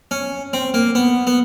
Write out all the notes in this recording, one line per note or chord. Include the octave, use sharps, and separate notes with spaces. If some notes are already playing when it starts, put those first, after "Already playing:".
C#4
C4
A#3
B3
B3